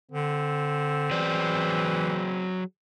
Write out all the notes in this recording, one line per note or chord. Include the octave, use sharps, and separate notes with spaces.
D3 C4
E3 F#3 G#4 D5